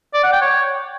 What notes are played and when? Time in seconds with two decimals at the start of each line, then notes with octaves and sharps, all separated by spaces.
0.14 D5
0.23 F#5
0.32 G5
0.41 C#5